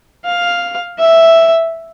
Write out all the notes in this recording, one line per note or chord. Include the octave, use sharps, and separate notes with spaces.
F5
E5